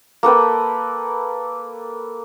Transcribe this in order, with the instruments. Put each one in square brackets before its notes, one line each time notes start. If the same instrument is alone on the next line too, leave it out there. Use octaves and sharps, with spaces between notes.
[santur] A#3 A4 B4 G5